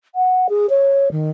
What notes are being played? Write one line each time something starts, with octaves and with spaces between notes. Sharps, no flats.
F#5
G#4
C#5
D#3